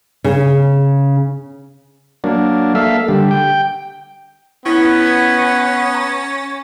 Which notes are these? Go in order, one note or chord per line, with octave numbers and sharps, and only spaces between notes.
C#3
F#3 A#3 D4
A#3 A4 E5 F5
D3 G3
G5
B3 C#4 E4 B6
G#6 B6 C#7
A#5